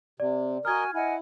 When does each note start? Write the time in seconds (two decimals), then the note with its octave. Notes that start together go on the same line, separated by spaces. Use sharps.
0.20 C3 D5
0.65 F#4 A#4 D#5 G#5 F6 G#6
0.94 E4 D#5 F#5 G#5